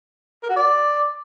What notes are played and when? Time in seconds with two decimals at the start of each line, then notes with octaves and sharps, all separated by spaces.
0.43 A#4
0.50 F#4
0.56 D5